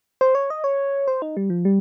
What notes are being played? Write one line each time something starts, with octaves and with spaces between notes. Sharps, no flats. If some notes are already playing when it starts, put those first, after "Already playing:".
C5
C#5
D#5
C#5
C5
D#4
G3
F3
G3